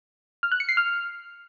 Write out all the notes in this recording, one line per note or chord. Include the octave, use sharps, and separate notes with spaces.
F6
F#6
C#7
C7
F6